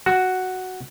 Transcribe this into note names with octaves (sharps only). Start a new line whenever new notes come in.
F#4